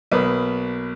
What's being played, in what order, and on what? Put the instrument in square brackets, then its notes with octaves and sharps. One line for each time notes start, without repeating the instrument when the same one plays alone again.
[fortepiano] B1 A#3 B4 D#6